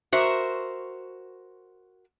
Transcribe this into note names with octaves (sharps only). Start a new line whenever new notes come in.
F#4 A#4 C5 E5